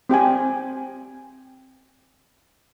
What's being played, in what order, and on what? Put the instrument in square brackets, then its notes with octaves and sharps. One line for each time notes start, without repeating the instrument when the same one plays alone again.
[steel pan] C4 G4 G5 G#5